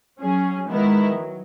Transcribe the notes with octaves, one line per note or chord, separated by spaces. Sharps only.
F#3 C#4 G#4
D#3 G#3 B3 E4 A#4
F#3